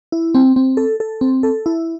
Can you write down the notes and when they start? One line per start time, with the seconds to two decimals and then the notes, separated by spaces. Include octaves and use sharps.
0.12 E4
0.35 C4
0.56 C4
0.77 A4
1.00 A4
1.21 C4
1.43 A4
1.66 E4